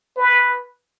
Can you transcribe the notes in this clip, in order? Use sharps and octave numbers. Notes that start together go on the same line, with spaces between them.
B4